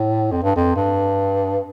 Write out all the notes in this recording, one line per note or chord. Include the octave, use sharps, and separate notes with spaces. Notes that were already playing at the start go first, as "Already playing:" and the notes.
Already playing: A2
F2
G2
F2
G2